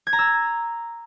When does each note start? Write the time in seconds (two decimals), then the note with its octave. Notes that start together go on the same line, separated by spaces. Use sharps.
0.07 G#6
0.13 A#5
0.19 E6